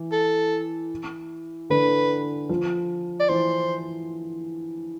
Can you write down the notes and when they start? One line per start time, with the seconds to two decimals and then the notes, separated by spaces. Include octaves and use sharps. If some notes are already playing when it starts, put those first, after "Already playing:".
Already playing: E3
0.12 A4
1.70 D3 B4
2.49 F3
3.20 D5
3.29 E3 C5